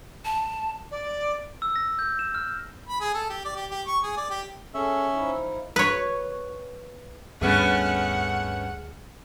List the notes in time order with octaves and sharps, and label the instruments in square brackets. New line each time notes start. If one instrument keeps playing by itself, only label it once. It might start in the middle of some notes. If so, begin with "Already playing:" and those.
[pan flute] A5
[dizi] D5
[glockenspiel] E6
A#6
G6
E7
F6
[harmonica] B5
G#4
A4
G4
D5
G4
G4
C#6
G#4
D5
G4
[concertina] C#4 E5 [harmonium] G#4 A4
[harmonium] F3 D#4 E4
[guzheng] B4 C#5
[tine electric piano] D2 G#4 F6 [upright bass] G2 [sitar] A3 B3 C#4 [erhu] F#5